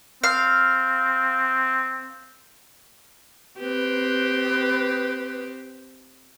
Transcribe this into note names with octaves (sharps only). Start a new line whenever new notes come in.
C4 F5
C4 G4 B4